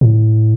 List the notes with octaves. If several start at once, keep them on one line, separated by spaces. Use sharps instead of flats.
A2